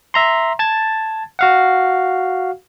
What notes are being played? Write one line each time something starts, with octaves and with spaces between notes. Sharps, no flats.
E5 A#5 C6
A5 G#6 A6
F#4 F5 F#5